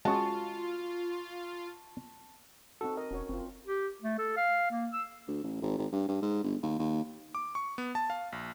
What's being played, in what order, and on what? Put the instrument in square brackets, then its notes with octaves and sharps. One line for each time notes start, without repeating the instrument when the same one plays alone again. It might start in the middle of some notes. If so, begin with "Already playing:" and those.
[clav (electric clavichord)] G#3 C#4 G#4 [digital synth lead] F4 [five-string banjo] F#4 [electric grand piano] A5 C#6
[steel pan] C4 D#4 F#4 [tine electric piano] A4
[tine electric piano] A#4 [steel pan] D#5
[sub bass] E1 [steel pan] C#4 F#4 C#5
[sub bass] F#1 [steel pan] C4 F4
[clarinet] G4
A3
A4
F5
A#3
E6
[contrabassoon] D2
A1
G#1
G#1
G2
G2
G#2
G1
D#2
D#2
[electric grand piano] D6
C#6
B3
A5
F5
A#1